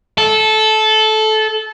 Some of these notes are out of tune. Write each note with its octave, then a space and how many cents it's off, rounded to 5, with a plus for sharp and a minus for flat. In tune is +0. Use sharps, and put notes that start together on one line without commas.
A4 -15